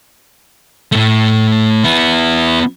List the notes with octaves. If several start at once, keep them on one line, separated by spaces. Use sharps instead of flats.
A2 A3
B3 E4